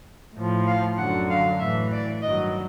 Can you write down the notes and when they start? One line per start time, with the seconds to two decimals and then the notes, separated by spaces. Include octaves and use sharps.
0.36 A2 F3
0.67 F5
0.98 F#2 D3 F#3 F#5
1.30 F5
1.60 A2 E3 E5
1.92 D5
2.23 G2 D#3 F#3 D#5